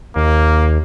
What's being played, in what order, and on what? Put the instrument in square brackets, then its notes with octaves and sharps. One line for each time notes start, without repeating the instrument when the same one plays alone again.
[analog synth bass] D#2 [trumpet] A#3